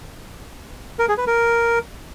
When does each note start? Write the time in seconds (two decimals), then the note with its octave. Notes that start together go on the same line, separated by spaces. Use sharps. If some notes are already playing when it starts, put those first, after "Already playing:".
0.99 A#4
1.08 G#4
1.18 B4
1.27 A#4